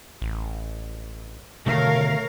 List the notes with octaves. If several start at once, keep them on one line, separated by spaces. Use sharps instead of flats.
A1
B2 D3 D#3 A3 A#4 C#5 F5